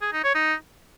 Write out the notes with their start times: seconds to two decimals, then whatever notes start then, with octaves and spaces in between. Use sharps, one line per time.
0.02 G#4
0.13 D#4
0.24 C#5
0.35 D#4